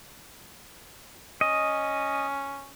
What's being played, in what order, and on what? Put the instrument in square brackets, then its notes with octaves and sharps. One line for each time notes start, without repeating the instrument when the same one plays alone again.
[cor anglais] C#4 [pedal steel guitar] D#5